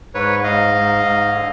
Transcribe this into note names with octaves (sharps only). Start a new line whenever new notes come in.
G#2 B4 C#5
G#2 D#5 F5
G#2
G#2
D3